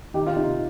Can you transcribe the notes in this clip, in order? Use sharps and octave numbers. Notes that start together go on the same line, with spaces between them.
D#3 D#4 G4
F4
C3 D#4